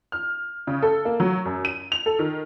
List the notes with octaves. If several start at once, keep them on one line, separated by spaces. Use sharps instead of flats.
F6
C#3
A4
A#3
F#3
F#2
D#7
F7
A4
D#3